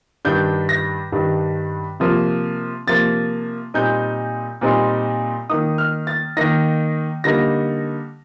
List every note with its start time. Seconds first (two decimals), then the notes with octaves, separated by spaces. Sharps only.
0.25 G2 D#3 G3 D4 G6
0.69 A#6
1.12 G2 D#3 G3 D4
2.00 C3 F3 A#3
2.87 C3 F3 A#3 A6
3.74 A#2 G3 C4 D#4 G6
4.61 A#2 G3 C4 D#4
5.49 D#3 A#3 D#4 D#6
5.78 F6
6.07 A6
6.37 D#3 A#3 D#4 A#6
7.24 D3 G3 A#3 D#4 A#6